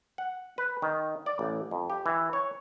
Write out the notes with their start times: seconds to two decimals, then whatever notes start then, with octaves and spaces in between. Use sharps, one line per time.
0.18 F#5
0.58 B4
0.82 D#3
1.26 D5
1.39 A1
1.71 F2
1.90 G4
2.06 E3
2.33 C#5